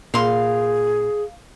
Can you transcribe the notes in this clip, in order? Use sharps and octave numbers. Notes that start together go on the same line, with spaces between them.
A#2 G#4 F5 C6